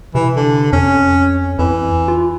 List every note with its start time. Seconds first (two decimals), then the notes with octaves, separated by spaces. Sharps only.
0.15 C3 E3
0.36 D3
0.73 F2 C#4
1.59 F2 E3
2.08 F4